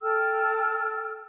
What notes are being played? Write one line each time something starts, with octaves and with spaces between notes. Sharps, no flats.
A4 G5 E6 F6